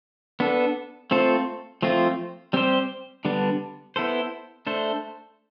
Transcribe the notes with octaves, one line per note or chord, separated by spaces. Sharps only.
B3 D4 A4
A3 C4 F4 A4 C5
F3 A3 C4 F4
G3 C4 G4 C5
D3 G3 B3 D4
B3 E4 A4 C5
A3 D4 A4 C5